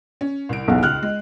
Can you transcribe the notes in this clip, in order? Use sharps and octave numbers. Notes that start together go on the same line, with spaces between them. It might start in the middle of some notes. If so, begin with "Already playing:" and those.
C#4
C2 D7
B1 E2 F#5
C#2 F6 F#6
G#3